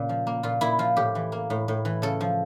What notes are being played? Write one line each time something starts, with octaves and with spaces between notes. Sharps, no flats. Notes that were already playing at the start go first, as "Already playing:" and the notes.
Already playing: A#2 C#3
F3
A#3
A#2 F4
A#2 E4
F3 F4
A2 G4
E3
A#3
A2
A2
E3
C#3 A4
F3